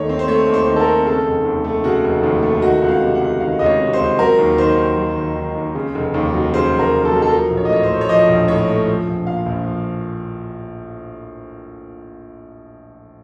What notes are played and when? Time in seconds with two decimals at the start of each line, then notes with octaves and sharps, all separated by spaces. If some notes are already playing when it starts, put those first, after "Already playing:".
Already playing: D#2 D#3 A3 C#5
0.09 C4
0.19 C5
0.28 A3 C#5
0.47 D#2
0.54 C5
0.67 D#3
0.76 A4
0.80 A#4
0.87 C4
1.06 C#3 A4
1.26 F1
1.45 D#2
1.64 A3
1.84 C#3 F#4
2.04 F1
2.23 D#2
2.43 A3
2.62 D#3 F#4
2.82 C#2 F#5
2.89 F5
3.02 C3
3.15 F#5
3.21 C#2
3.40 D#3 F5
3.59 C#2 D#5
3.66 C#5
3.80 C3
3.93 C5
3.99 C#2
4.19 F#3 A#4
4.38 D#2
4.58 D#3 C5
4.77 D#2
4.97 F#3
5.16 D#2
5.37 D#3
5.55 D#2
5.75 C#3
5.95 F1
6.14 D#2
6.34 F#3
6.54 C#3 C5
6.73 F1
6.79 A#4
6.93 D#2
7.05 A4
7.12 F#3
7.22 A4
7.31 F3 A#4
7.50 A#1
7.57 C#5
7.65 D#5
7.70 A2 C#5
7.83 C5
7.90 A3
8.01 C#5
8.09 F3 D#5
8.28 A#1
8.48 A2 C#5
8.68 A3
8.87 F3
9.07 A#1
9.27 A#2 F5
9.46 A#1
9.65 F3